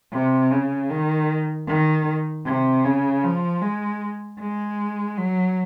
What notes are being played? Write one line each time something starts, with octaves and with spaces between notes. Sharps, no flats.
C3
C#3
D#3
D#3
C3
C#3
F3
G#3
G#3
F#3